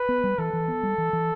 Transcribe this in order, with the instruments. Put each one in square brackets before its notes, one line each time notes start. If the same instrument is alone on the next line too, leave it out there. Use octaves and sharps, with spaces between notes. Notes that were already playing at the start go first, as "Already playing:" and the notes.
Already playing: [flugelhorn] B4
[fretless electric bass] B3
G3
[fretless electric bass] E3 [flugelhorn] A4
[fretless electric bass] E3
B3
G3
E3
E3